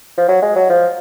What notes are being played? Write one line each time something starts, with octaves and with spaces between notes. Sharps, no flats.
F3
F#3
G#3
F#3
F3